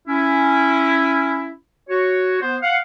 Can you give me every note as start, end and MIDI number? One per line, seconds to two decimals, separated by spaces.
0.08 1.53 61
0.08 1.53 64
1.89 2.40 66
1.89 2.40 73
2.41 2.56 59
2.41 2.56 72
2.62 2.76 77
2.62 2.76 78